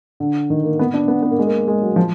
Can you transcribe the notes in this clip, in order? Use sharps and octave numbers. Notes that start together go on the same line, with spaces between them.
D3
D#3
A#3
B3
D4
B3
B3
A#3
G#3
A#3
G#3
F#3
F3